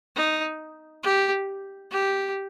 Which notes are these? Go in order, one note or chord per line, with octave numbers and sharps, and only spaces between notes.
D#4
G4
G4